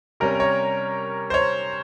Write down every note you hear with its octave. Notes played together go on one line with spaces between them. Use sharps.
C3 G3 C#4 A#4
C#5
C5
C#5